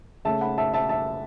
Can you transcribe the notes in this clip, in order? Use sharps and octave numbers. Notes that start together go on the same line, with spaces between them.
C#3 A3 C#4 E5 A5
F#5 B5
E5 A5
E5 A5
E5 A5